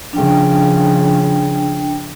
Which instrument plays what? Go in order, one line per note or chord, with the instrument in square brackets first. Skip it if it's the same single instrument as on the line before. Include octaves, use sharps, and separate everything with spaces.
[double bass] C#3 F3 [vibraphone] D4 G5